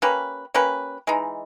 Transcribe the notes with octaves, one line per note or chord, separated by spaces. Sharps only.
A#3 C#4 G4 B4
A#3 C#4 G4 B4
E3 G#3 D#4